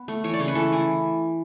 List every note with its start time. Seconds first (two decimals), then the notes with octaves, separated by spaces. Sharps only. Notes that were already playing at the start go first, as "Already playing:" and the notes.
Already playing: B3
0.08 A3
0.24 E3 C#5
0.34 D5
0.40 C#3 C#5
0.48 B4
0.55 E3 A4
0.72 E3